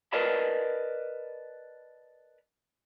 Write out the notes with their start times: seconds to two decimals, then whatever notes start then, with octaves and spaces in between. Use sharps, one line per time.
0.12 A#4 B4 D5 D#5 A5 B5